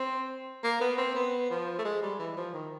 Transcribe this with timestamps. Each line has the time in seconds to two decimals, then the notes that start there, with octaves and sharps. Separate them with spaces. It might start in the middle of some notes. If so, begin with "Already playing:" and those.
Already playing: C4
0.64 A#3
0.81 B3
0.98 C4
1.15 B3
1.50 F3
1.79 A3
1.85 G#3
2.02 G3
2.19 E3
2.37 F3
2.54 D#3